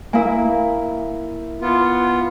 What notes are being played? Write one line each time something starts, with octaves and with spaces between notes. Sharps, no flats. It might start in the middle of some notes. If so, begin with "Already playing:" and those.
A#3 E4 A#4 F5 G#5
B3 F4